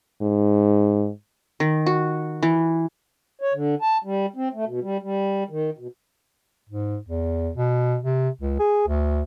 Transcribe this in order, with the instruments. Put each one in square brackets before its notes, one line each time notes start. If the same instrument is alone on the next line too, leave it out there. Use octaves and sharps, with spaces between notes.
[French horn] G#2
[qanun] D#3
F#4
E3
[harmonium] C#5
D3
A5
G3
C4
A3
B2
G3
G3
D#3
B2
[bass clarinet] G#2
E2
B2
C3
C#2
G#4
D2